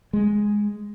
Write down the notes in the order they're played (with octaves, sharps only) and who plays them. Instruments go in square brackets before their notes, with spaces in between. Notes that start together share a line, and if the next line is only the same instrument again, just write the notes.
[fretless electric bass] G#3